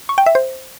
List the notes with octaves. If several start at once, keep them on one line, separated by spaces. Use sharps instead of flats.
C#6
G5
E5
C5